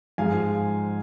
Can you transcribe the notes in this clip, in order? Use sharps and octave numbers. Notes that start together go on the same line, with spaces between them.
G#2 F3 G#3 F5 G#5